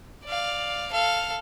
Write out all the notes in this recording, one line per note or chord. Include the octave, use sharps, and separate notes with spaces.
D5 F5
A4 F5